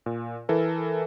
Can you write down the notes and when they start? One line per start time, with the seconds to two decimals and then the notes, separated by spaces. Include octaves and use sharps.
0.06 A#2
0.49 E3 A4 A#4